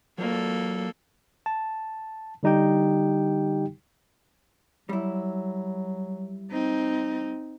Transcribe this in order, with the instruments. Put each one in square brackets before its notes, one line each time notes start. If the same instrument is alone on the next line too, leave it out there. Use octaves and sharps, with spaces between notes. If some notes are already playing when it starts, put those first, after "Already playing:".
[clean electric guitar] F#3 F4 D5 [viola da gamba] A#3 A4
[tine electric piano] A5
D3 G3 D#4 G4 G5
[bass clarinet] F#3 [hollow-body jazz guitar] G3 E4
[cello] C4 D#4